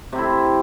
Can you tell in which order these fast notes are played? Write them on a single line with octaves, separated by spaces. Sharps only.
C3 C4 E4